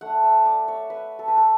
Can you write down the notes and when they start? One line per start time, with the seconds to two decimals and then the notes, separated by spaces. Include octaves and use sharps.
0.01 A3 D4 F#5
0.24 E5
0.46 D5
0.68 C#5
0.90 B4
1.19 A4
1.28 B4
1.37 A4